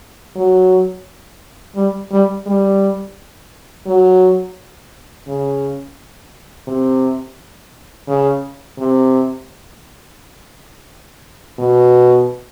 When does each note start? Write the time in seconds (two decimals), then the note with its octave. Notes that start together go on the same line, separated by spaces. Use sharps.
0.36 F#3
1.76 G3
2.11 G3
2.46 G3
3.86 F#3
5.27 C#3
6.67 C3
8.08 C#3
8.78 C3
11.58 B2